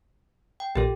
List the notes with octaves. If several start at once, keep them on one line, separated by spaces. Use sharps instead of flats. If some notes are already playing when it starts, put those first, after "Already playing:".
G5
A#1 A#2 G4 A4